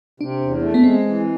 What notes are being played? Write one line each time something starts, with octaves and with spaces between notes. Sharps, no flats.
C3 D4
E2
A3
B3
G#3 C4
E3